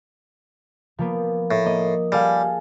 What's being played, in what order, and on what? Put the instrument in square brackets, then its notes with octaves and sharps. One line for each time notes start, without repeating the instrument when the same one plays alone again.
[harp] F3 A#3 B3
[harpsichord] A2
[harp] A#3 D#5 D#6
[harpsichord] G3 [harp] G#4 A4 F5